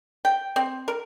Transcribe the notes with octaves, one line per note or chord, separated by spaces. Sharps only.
G5
C4
A#4